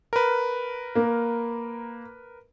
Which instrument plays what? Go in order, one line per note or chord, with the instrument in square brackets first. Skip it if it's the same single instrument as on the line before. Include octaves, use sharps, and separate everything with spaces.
[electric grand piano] A#4 B4
[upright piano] A#3